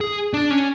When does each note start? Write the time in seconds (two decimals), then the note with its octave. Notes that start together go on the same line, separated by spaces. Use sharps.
0.01 G#4
0.34 D4
0.50 C#4